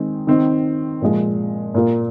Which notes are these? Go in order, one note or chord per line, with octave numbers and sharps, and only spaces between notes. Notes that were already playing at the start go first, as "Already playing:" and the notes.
Already playing: D#3 G#3 C4 D#4
D#3 C4 D#4
A#2 F3 G#3
A#2 A#3 F4